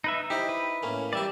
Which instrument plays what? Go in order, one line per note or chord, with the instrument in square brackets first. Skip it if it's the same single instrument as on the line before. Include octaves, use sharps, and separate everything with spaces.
[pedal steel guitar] D#4 B4 E5
[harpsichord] D#4 E4 C5 [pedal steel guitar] G4
[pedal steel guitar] B4
[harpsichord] A2 A#3 C#4
[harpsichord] G3 G4 [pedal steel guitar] D5 E5